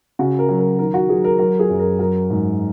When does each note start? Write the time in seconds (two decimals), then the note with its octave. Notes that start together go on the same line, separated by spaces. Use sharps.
0.19 C#3 F#4
0.39 A#4
0.49 F#3
0.59 A#4
0.79 D#3 A#4
0.94 F#4
1.09 F#3 G#4
1.24 A#4
1.39 F#3 A#4
1.59 G#4
1.70 F#2
1.79 A#4
1.99 F#3 A#4
2.30 G#2